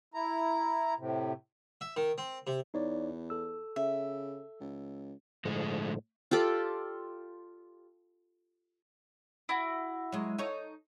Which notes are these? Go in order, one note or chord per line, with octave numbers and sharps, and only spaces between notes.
E4 A#5
A2 C3
E5
D#3
C4
C3
E2 D#4 C#5 D5
A4 E6
C#3 E5
C#2
A2 D3 F3 G#3
F4 G4 A4 D5
E4 F#4
F#3 G#3
D#4 A4 C#5